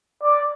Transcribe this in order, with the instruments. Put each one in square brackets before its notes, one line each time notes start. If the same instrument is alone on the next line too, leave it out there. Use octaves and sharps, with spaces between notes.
[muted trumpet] D5